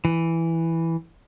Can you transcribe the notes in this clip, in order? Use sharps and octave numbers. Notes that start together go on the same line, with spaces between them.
E3